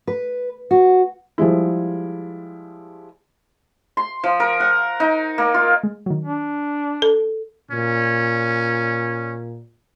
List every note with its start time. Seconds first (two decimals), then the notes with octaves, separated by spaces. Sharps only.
0.07 B4
0.71 F#4
1.38 F3 G3 G#3 E4
3.97 C6
4.24 F3
4.40 A#4
4.60 F#5
5.00 D#4
5.38 A#3
5.54 F4
5.83 G#3
6.06 D#3 F#3
6.25 D4
7.02 A4
7.71 A#2 C#4